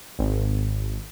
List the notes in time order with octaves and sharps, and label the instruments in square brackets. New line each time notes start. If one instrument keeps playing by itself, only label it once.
[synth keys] G#1